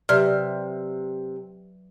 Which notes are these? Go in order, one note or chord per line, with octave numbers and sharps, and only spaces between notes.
C3 F#3 B4 D5 E5 F6